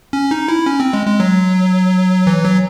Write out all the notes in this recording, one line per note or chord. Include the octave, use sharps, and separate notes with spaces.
C#4
D#4
E4
C#4
C4
G#3
G#3
F#3
E3
F#3